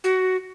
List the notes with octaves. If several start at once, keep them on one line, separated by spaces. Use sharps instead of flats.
F#4